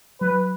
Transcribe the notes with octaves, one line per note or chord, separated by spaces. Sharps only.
F#3 B4